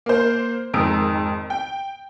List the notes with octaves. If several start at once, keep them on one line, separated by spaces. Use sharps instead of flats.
A#3 C5
F2 G#2 D#3 A#5 E6 D7
G5